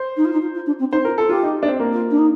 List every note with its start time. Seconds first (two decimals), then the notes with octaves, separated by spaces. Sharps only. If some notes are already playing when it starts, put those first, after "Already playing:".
Already playing: C5
0.16 D#4
0.24 F4
0.33 D#4
0.41 F4
0.54 F4
0.66 D4
0.79 C4
0.91 D#4 C5
1.05 F4 A#4
1.17 F4 A4
1.29 F4 G4
1.43 D#4
1.63 D4
1.68 C4
1.80 A#3
1.93 F4
2.10 D4
2.18 D#4